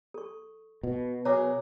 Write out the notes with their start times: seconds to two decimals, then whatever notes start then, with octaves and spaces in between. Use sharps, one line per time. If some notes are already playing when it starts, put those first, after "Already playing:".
0.14 A4 C#6
0.83 B2
1.25 F#3 G#4 A#4 C#5 A#5 D6